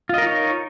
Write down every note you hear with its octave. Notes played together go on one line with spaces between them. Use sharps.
D#4 F4 A#4 C#5 D#5